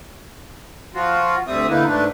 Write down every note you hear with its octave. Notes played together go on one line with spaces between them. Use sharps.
F3 F4 F#4
D2 G3 C4 E5 D#6
D3 A#3 D#4 E4 B4
G#2 A3 D4 B4